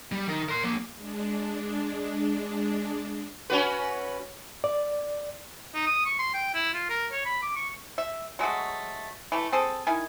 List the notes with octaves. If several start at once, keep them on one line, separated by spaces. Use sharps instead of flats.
G3
D#3
A#4 C6
F3 A#3
G#3 D4
C#4 F#4 B4
D5
D#4
D#6
C#6
C6
G5
E4
F4
A#4
C#5
B5
D6
C#6
E5
F#3 G#3 A3 F#4
E3 A3
C4 G#4 A4
D#3 E4 G#5